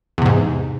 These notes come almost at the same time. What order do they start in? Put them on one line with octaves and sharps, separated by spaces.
E2 C3 G#2